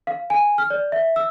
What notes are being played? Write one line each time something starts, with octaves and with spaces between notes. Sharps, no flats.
F5
G#5
F6
D5
E5
E6